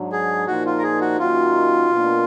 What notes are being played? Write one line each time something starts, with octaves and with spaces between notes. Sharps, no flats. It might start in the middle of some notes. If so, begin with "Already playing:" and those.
Already playing: G#2 F#3 D4
G#4
A#2 F3 A#3 D#4 F#4
F4
A#4
G#4
F#4
F#2 D#3 A#3 D#4 F4 F#4
B2 A#3 D4